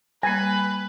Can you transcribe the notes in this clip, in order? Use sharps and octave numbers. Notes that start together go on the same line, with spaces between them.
G3 A#3 B4 G#5